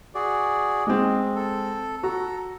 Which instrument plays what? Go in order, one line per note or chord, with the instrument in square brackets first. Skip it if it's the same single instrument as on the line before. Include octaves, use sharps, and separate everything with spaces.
[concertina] F#4 G#4 D5
[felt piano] G#3 C4 [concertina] D#5
[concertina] A4
[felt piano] F#4 [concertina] A4 A#5